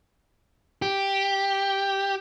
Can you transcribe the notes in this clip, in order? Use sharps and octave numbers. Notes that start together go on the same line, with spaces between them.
G4